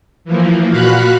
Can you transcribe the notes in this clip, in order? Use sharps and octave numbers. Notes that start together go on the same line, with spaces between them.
E3 F3 A#3
A#2 F#4 F5 B5 F#6